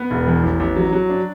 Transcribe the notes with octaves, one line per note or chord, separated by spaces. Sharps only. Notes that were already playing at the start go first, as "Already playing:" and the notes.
Already playing: B3
E1
E2
A1
A1
F#3
F#3
D4